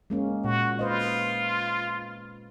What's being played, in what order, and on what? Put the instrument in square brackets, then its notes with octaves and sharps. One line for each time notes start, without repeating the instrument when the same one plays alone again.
[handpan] G#3 A#3 C#4
[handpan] A#2 [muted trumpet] F#4
[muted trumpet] F4 [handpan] B4 C5 D#5